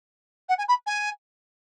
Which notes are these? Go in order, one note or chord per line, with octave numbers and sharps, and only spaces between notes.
F#5
G#5
B5
G#5